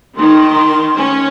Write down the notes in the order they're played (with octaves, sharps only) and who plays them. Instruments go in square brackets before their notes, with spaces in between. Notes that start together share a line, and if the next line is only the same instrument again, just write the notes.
[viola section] D#3 [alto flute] C6
[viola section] C#4